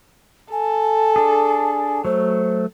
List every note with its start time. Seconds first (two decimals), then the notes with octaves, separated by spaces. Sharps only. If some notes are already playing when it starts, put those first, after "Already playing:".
0.52 A4 G#5
1.16 D4 G#4
2.05 F#3 A3 C5